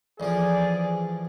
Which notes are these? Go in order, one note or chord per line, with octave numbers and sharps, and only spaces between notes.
A1 F3 G#4 D5